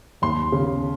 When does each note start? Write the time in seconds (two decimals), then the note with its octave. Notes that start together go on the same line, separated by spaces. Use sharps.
0.22 D#2 C6
0.52 C#3